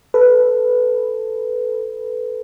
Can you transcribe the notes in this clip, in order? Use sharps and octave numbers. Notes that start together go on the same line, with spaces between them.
A4 B4